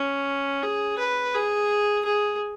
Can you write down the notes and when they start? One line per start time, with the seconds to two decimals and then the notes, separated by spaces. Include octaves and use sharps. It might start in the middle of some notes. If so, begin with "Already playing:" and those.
Already playing: C#4
0.62 G#4
0.98 B4
1.34 G#4
2.05 G#4